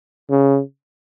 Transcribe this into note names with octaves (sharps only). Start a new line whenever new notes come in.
C#3